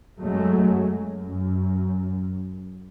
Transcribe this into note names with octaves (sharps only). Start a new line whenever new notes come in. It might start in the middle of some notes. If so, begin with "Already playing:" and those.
F#2 F#3 G#3 A3
F#2